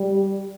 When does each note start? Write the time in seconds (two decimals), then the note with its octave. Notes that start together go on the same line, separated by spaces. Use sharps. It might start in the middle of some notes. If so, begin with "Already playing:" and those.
Already playing: G3